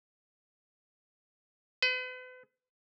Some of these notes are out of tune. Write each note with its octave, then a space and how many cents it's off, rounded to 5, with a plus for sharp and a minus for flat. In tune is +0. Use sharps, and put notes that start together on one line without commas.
B4 +40